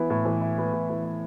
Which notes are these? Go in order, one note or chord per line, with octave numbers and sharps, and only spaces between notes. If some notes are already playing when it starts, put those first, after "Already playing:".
Already playing: E3 B3 E4
A2
E3
E4
B3
A2
E3
E4